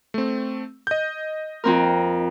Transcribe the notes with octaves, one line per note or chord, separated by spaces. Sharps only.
A3 C4
D#5 G6
F2 C4 A#4